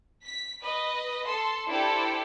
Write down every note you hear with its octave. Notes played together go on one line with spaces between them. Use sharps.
B6
B4 D#5
A4 C6
D4 E4 G4 A4 C5